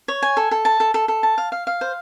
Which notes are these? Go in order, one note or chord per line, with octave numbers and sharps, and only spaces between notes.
C#5
G#5
A4
A4
A5
A4
A4
A4
A5
F5
F5
F5
C5